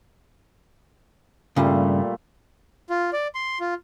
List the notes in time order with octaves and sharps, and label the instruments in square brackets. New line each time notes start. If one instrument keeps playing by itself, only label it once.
[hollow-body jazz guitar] G2 C#3 [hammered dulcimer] A#2 G3 A3
[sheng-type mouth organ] F4
D5
C6
F4